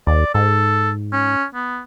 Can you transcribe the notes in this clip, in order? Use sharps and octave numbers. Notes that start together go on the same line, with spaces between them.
D#2 D5
G#2 A4
C#4
B3